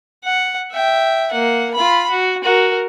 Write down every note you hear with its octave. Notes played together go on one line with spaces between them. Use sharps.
F#5
E5 G5
A#3 F#5
F4 B5
F#4
F#4 A#4